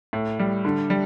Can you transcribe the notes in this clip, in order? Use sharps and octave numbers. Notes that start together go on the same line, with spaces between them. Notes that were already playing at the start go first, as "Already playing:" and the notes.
A2
G3
D3
G3